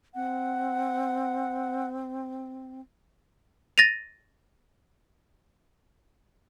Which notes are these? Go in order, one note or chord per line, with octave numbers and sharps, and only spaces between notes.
C4 F#5
A6 A#6 D#7 F7